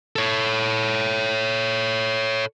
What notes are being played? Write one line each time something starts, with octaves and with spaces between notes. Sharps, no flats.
A4 C#5